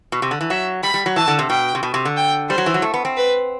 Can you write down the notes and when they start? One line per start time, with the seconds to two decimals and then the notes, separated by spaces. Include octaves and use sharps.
0.12 B2
0.22 C3
0.31 D3
0.41 E3
0.50 F#3 E5
0.83 G3 B5
0.94 G3
1.06 F#3
1.16 E3 A5
1.28 D3
1.39 C3
1.50 B2 G5
1.75 C3
1.83 B2
1.94 C3
2.05 D3
2.17 G5
2.49 G3 C5
2.58 F#3
2.66 E3
2.74 F#3
2.82 A3
2.94 B3
3.05 C4
3.16 B4